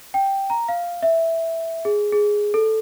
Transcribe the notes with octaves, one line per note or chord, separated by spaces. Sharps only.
G5
A#5
F5
E5
G#4
G#4
A4